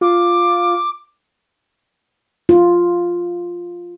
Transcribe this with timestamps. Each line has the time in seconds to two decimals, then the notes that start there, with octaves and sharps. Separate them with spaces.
0.01 F4 D6
2.49 F4